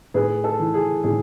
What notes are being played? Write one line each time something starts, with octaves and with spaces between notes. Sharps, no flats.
A2 G#4 B4
A4
E3
G#4
A2 G#4